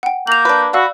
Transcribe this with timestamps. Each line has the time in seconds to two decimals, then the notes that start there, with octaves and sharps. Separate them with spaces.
0.03 F#5 G5
0.27 A#3 G6 F7 F#7
0.45 D4 B4
0.73 F#4 D5 F5 B5 E6